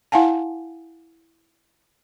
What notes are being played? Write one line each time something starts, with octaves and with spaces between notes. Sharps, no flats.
E4 F5 F#5 G#5 A5